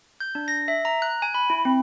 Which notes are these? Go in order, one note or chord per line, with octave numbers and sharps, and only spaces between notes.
G6
D4
A#6
E5
A#5
F#6
G#5
B5
E4
C4